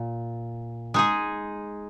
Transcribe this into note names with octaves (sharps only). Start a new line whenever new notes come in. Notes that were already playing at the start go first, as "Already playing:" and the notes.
Already playing: A#2
G#3 D#4 G#4